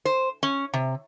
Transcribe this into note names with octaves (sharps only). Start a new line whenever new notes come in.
C5
C#4
C3